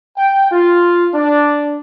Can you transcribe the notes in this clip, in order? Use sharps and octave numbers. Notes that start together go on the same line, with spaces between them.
G5
F4
D4